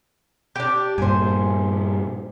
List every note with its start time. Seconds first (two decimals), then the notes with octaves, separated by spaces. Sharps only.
0.56 D4 G4
0.98 G2 A#2 C5 G#5